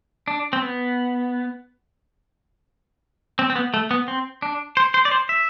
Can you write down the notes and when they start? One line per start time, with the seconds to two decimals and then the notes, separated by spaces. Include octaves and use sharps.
0.28 D4
0.53 C4
0.62 B3
3.39 C4
3.50 C4
3.56 B3
3.74 A3
3.91 B3
4.08 C4
4.42 D4
4.77 C5
4.94 C5
5.05 D5
5.11 C5
5.29 E5